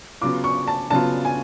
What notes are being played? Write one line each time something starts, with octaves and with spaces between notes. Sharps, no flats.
C#3 F#3 B3 F4 D6
C#6
A5
C#3 F#3 B3 F4 A5
G#5